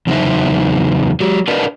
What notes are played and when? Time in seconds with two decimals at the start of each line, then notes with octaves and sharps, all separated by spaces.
0.07 E2 C#3 F#3 D#4 C5 E5
1.20 F#3 G4
1.48 D4 A#4 B4 D5 D#5